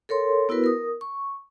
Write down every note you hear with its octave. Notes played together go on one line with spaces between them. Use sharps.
A4 A#4 C#5 C6
B3 E4 F#4 A#4 B4
A#4 D#6
C#6